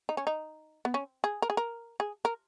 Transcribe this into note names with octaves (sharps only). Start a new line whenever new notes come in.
D#4
C#4
D#4
B3
C#4
G#4
A#4
G#4
A#4
G#4
A#4